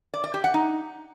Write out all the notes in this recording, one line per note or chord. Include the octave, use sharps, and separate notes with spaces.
D5
D5
G4
F#5
D#4